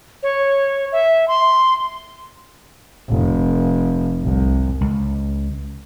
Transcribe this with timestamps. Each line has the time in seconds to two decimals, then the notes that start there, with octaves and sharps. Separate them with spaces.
0.23 C#5
0.92 E5
1.28 C6
3.09 F1
4.23 C2
4.81 C#2